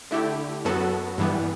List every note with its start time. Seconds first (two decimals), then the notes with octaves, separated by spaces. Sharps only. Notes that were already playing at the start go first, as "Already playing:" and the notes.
0.11 D3 A3 E4 G4
0.65 F#2 F#3 B3 F#4 A4
1.18 G2 E3 G3 B3